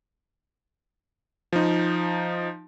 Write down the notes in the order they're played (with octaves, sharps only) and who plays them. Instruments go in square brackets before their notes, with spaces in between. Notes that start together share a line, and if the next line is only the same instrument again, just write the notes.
[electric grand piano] F3 D#4